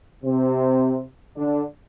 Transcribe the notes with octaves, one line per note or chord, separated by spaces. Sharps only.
C3 C4
D3 D4